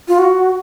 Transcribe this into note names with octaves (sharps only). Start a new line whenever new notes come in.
F4
F#4